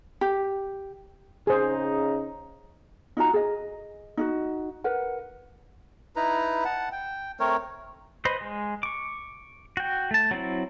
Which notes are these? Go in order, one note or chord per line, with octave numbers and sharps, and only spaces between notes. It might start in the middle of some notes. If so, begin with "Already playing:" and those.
G4
C#3 D#4 G#4 C5
D#4 F4 F#4 A#5
G#4 D#5
D#4 F4 F#4
A#4 B4 F#5
D#4 E4 B4 A#5
F#5 A5
G5
A3 C4 A#4 C#5
B4 C5 D#5 B5 C6
G#3
C#6 D6
F#4 G5
A3 A5
F#3 C4 E4